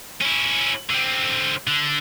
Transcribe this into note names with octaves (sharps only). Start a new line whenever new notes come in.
C#4 E4
D3 C4
D3